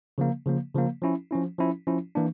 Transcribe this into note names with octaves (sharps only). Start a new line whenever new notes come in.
C#3 F3 A#3
C#3 F3 A#3
C#3 F3 A#3
F3 C#4 E4
F3 C#4 E4
F3 C#4 E4
F3 C#4 E4
E3 A#3 D4